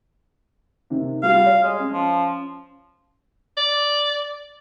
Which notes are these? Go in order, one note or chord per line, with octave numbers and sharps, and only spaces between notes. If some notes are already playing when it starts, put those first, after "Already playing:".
C3 D#3
G3 F4 F#4 F5
C#5
G#3
C#4
F3
D5